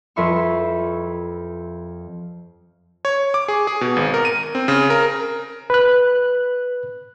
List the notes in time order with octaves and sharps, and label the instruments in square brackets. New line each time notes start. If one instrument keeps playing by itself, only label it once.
[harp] F2 B4 E5 C6 C#6
[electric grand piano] C#5
D6
G#4
G#4
B2
G#1
A#4
D#7
C4
C#3
A#4
[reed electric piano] B4 F#6